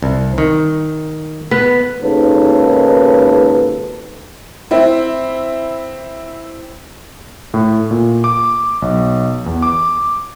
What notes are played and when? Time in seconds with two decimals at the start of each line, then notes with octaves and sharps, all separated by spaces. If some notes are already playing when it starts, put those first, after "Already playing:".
0.03 C2
0.38 D#3
1.51 B3 B4
2.01 G#1 D#2 G#2 C#3 A4 B4
4.71 C4 E4
7.54 A2
7.91 A#2
8.24 D6
8.82 B1
9.46 E2
9.62 D6